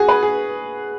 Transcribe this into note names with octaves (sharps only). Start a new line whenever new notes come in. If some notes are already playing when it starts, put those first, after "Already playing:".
Already playing: F#4 G#4
B4
G#4